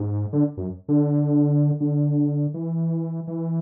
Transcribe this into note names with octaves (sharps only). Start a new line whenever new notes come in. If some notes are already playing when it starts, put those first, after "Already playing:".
Already playing: G#2
D3
F#2
D3
D3
E3
E3